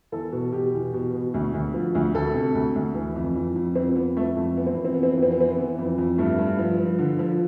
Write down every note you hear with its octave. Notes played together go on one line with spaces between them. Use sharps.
E2 A4
B2
B2 G4
E2
B2
B2
D2
D2
F3
D2
D2 A4
C3
D2
D2
E3
F2
F2
F2
F2 C4
F2 B3
F2 A3
F2 A3
E3 B3
C4
F2 B3
C4
E3 B3
C4
F2 B3
C4
B3
E3 C4
B3
E3
F2
F2
G2 A3
G2
F3
F3
D3
F3